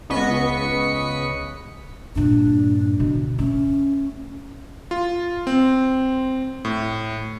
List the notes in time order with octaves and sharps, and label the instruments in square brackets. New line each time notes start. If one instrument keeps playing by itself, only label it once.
[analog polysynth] C#2 B3 D#5 C#6 B6 C#7
[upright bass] G2 A#2 [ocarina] D4
[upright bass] D2 B2
[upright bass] A3 [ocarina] C#4
[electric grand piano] F4
C4
A2